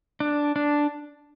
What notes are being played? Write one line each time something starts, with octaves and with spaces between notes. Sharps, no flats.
D4
D4